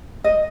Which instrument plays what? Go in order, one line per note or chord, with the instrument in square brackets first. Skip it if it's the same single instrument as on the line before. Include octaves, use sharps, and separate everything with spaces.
[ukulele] D#5